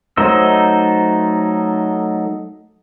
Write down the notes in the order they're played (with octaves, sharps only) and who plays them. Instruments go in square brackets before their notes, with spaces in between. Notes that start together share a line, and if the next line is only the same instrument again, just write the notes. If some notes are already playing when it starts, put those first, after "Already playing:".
[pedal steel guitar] F#3 A3 D#4 C5 E6